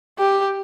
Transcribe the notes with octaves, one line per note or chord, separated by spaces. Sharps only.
G4